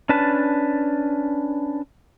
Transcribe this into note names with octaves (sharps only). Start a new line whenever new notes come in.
C#4 D4 B4 A5